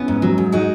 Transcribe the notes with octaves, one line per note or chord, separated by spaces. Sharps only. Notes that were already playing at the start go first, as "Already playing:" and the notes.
Already playing: B3 C#4 E4
G#2
F#3
G#2
G#3 D#4 F#4